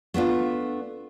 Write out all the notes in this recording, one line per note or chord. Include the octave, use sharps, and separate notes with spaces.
A3 B3 D4 F4